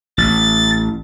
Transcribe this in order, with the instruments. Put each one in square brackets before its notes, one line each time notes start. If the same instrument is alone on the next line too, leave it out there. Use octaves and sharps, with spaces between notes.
[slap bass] A1 [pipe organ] A6